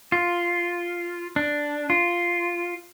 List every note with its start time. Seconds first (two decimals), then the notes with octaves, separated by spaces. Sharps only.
0.12 F4
1.36 D4
1.90 F4